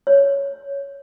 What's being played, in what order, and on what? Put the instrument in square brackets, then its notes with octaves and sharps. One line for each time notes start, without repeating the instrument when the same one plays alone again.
[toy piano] C#5